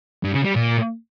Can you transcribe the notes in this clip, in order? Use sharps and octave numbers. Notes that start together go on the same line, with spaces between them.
G2
C#3
G3
A#2